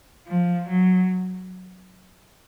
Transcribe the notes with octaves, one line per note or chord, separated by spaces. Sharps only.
F3
F#3